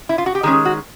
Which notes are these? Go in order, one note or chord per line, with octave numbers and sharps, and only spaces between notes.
E4
F4
F#4
G4
D#3 G#3 C#4 G#4
F#4